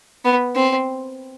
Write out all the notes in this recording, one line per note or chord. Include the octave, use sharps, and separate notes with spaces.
B3
C4